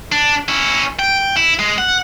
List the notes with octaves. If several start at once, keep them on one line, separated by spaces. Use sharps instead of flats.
D4
C#4 E4
G5
E4
G#3
F#5